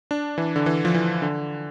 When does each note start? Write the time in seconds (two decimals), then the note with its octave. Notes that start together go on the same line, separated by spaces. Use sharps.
0.11 D4
0.38 E3
0.56 D3
0.66 E3
0.85 F3
0.94 E3
1.22 D3